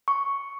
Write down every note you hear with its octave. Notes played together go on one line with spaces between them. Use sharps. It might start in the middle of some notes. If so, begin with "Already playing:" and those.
C#6